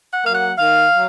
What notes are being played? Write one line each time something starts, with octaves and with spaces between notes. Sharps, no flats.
F#5
F#3 A#3 F5
F#5
D#3 F5
F#3